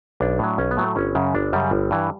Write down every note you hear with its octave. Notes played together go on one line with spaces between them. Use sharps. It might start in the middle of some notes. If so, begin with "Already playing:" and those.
B1 D4
A2 F#3
B1 C#4
B3
A2 F#3
A3
G1 C#4
F#2 C#3
G1 D4
F#2 C#3 G3
G1
G2 E3